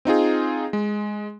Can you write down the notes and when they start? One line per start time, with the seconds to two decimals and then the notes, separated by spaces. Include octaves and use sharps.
0.05 C4 D#4 F4 G#4
0.73 G#3